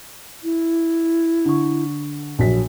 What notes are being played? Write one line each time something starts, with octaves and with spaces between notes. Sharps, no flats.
E4
D3 C#6
A#1 F#3 B6